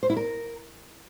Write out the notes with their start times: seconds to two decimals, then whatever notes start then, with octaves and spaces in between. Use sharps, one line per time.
0.03 C5
0.10 E4
0.17 A#4